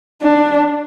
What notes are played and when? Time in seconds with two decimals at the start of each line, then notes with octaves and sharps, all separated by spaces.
0.22 D4